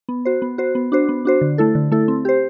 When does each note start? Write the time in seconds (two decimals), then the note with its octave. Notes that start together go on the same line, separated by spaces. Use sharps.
0.09 B3
0.25 F#4 C5
0.42 B3
0.58 F#4 C5
0.75 B3
0.92 D4 F#4 C5
1.09 B3
1.25 D4 F#4 C5
1.41 D3
1.58 A3 E4 A4
1.75 D3
1.92 A3 E4 A4
2.08 C4
2.25 G4 C5